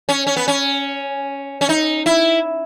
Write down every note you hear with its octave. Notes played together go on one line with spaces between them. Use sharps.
C#4
C#4
B3
C#4
C#4
D#4
E4